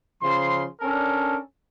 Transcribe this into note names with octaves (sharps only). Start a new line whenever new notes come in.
C#3 F3 C6
C#4 D4 A4 A#4